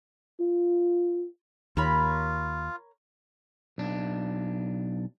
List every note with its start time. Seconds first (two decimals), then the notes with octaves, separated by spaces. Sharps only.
0.40 F4
1.77 D#2 F4 A#4 C#5 B5
3.78 B1 D4